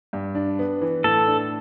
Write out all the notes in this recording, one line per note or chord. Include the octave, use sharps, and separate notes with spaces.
G2
D4
B3
E3
A2 A4
D4